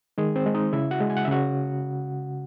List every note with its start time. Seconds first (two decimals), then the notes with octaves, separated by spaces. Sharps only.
0.18 D#3 G#3 G#4
0.36 C4 C5
0.46 G#3
0.55 D#4 D#5
0.73 C#3 E4 E5
0.91 F#4 F#5
1.01 G#3
1.10 G#5
1.17 F#5
1.25 E5
1.28 C#3 F#4 F#5